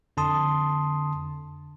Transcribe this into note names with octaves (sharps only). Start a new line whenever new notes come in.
F2 D3 A5 C6 D#6